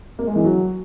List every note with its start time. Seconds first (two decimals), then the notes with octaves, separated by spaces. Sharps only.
0.19 A#3
0.27 G#3
0.36 E3
0.44 F#3